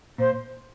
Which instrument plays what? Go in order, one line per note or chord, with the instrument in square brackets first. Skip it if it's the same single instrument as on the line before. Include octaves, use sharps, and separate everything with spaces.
[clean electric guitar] A#2 [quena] C5